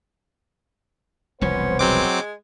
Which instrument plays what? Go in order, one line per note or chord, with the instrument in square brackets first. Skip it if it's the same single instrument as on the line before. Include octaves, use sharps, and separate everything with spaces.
[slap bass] E1 C2 F3 [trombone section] B3 C5 [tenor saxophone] C#4
[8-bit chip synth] F#3 C4 D6 [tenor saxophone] G#3